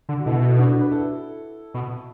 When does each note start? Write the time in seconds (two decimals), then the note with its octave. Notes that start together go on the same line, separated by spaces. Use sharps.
0.09 D3
0.19 F#4
0.26 B2 E4 A4
0.48 A4
0.58 D4 F#4
0.80 B4
0.91 E4 A4
1.74 B2